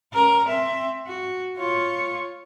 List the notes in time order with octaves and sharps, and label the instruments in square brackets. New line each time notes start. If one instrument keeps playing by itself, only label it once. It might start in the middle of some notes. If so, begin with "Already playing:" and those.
[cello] C#4 A#4
C4 E5
F#4
F4 C#5